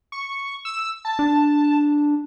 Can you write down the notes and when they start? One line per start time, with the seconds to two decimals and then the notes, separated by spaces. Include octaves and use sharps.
0.12 C#6
0.65 E6
1.05 A5
1.19 D4